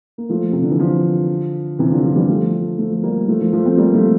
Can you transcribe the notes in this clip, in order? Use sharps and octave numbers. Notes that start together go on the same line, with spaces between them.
A#3
F3 A3
C3
D3
E3
D3 F3
C3 E3
D3 F3
D3 F3
E3 G3
F3 A3
F3 A3
A3
G3 A#3
F3 A3
F3 A3
F3 A3
A3 C4
G3 A#3
F3 A3